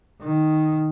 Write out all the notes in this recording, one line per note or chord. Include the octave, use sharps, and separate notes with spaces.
D#3